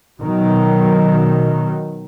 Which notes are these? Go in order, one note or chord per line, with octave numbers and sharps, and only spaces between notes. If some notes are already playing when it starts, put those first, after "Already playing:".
B2 D#3 F#3